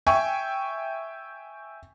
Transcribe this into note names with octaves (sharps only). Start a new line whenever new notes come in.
E5 G5 G#5 C#6